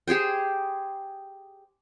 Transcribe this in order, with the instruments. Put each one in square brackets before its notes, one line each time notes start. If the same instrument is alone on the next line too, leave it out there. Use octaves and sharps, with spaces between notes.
[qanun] G4 G#4 C5 G5